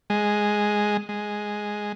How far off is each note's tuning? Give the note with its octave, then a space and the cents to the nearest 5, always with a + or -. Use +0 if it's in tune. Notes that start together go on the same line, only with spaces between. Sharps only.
G#3 +0
G#3 +0